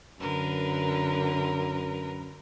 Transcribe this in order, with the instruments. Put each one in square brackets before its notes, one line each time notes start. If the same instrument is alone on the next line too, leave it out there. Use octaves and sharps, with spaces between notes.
[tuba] F#2 [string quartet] D3 A#4 B4